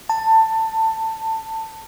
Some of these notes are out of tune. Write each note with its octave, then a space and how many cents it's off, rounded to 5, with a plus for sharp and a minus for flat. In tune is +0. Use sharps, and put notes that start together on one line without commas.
A5 +20